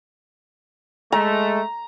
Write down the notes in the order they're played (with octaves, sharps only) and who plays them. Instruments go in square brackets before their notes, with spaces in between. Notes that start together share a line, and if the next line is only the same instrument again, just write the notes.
[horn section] G#3 A3 [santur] A#5